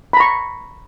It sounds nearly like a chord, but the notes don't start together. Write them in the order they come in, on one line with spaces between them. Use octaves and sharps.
B5 A#5 C#6